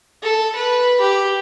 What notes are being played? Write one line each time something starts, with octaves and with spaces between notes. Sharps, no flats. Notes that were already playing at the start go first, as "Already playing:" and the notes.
A4
B4
G4